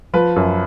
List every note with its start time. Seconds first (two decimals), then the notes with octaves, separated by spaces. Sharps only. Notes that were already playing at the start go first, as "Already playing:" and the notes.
0.14 F3 B4
0.36 F#2